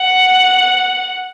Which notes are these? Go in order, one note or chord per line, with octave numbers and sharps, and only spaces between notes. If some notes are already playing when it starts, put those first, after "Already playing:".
Already playing: F#5